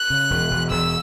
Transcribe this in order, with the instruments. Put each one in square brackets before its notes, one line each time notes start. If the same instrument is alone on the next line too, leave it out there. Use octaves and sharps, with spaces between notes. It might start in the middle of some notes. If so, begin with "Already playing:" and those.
Already playing: [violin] F#6
[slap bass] C#3
E1
E1
[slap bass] E1 [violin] E6